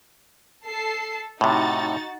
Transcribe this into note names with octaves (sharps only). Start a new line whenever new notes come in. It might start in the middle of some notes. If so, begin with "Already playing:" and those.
A4 A5 C7
A2 C3 D#4 F#4 A6